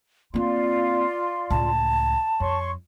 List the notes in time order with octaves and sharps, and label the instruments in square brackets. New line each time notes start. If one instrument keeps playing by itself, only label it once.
[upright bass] A#3 C4 [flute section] F4 D5 C6
[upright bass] C#2 A2 [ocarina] A5
[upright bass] F2 [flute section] C#5 C6 C#6